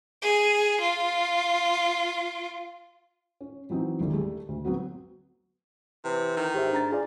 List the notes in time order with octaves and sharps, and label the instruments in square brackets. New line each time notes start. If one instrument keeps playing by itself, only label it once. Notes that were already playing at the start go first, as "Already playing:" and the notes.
[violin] G#4
F4
[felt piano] C#4
E3 F#3 C4 D#4
F#1 D#2 D3
G3 A3 G#4 A4
D2
F#3 B3 C4 F#4
[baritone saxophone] C3 [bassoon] E3
[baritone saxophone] D#3
[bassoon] G#2 [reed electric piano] G4 C5 E5
[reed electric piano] D4 A#5 A6
[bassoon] F4 [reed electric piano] G#4 D5